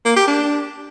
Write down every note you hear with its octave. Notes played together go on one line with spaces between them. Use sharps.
A#3
G4
D4